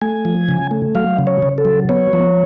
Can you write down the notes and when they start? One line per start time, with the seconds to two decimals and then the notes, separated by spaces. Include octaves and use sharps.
0.01 A3 G#5
0.25 F3
0.49 C#3
0.71 A3
0.95 F#3 F5
1.18 C#3
1.27 C#5
1.42 C#3
1.58 A4
1.65 F#3
1.89 B3 C#5
2.13 F3